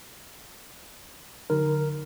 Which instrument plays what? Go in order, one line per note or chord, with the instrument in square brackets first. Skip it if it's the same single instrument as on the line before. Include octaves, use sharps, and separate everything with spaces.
[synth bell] D3 D#4 [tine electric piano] A#4